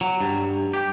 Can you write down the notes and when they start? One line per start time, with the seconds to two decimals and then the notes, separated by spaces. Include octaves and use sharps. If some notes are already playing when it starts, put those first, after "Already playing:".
0.01 F#3
0.20 G2
0.73 G4